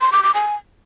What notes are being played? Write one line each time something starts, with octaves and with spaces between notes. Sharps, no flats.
C6
D6
D6
G#5